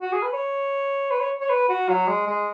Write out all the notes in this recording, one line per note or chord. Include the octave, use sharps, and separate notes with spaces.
F#4
G#4
B4
C#5
B4
C#5
C#5
B4
F#4
F#3
G#3
G#3